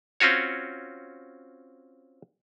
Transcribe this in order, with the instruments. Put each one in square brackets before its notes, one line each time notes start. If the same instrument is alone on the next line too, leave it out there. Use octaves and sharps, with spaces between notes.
[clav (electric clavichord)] C4 C#4 F4 F#4 C#5